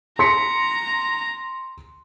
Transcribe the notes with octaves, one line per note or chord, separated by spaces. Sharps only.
A#5 C6 B6 C#7